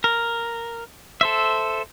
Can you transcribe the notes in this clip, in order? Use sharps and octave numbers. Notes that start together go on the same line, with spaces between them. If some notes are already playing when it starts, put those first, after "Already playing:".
A#4
A4 C5 E5